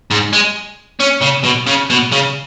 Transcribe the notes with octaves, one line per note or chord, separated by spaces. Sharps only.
G#2
G#3
C#4
C#3
B2
C#3
B2
C#3